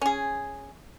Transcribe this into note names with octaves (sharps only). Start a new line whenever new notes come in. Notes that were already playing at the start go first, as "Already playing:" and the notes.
C#4 G#4